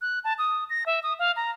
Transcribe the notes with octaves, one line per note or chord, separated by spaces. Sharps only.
F#6
A5
D#6
A#6
E5
D#6
F5
A#5